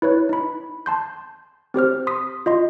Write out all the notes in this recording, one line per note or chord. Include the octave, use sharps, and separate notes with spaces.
E4 B4 C#5
D#4 B5
A5 C6 G6
C4 G4 C5 F6
C6 D#6 B6
F4 D#5 C6